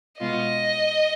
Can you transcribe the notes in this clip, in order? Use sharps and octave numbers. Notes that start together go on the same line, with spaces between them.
B2 G#3 B3 F4 D#5